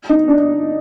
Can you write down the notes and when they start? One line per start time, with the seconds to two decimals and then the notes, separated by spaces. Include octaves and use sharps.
0.09 D#4
0.28 D4